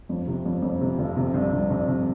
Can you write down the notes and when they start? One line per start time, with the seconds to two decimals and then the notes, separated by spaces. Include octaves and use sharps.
0.09 F2
0.27 C3
0.45 F2
0.62 F2
0.81 C3
0.99 F1
1.17 C3
1.34 C2
1.53 C2
1.70 C2
1.88 C2